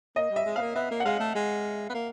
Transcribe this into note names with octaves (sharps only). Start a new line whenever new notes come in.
A#3 D#5
G3
E5
G#3
B3 F5
A#3
B3 E5
A#3
F#5
G#3 F5
A3
G#3
B3
A#3